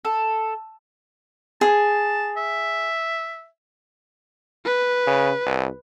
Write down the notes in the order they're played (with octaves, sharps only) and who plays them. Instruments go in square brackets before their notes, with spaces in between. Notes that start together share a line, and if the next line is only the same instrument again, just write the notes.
[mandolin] A4
[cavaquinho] G#4 [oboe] A5
[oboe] E5
[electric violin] B4
[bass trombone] C#3
C2